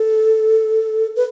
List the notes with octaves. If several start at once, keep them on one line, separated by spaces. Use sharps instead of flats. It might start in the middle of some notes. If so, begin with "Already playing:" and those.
Already playing: A4
B4